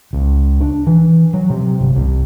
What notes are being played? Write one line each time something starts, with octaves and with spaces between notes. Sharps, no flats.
C#2
D4
E3
F#3
C3
G1
C2